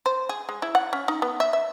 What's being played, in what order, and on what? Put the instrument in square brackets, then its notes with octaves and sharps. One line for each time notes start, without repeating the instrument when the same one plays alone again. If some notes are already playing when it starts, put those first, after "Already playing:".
[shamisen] C5
G#4
G#3
E4
F#5
C#4
D#4
B3
E5
E5